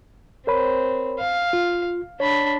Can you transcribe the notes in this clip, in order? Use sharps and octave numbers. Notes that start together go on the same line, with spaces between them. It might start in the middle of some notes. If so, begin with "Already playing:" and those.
C4 A#4 C#5 B5
F5
F4
D4 C#5 B5